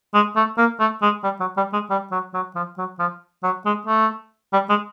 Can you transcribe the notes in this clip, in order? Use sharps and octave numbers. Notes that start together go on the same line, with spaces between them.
G#3
A3
A#3
A3
G#3
G3
F#3
G3
G#3
G3
F#3
F#3
F3
F#3
F3
F#3
G#3
A3
G3
G#3